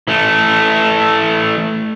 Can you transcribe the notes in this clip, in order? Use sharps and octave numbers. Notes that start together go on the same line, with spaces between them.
E3 A3